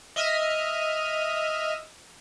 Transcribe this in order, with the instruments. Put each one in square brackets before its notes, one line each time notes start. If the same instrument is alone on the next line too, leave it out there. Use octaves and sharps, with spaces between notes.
[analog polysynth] D#5 E5 D#6 F6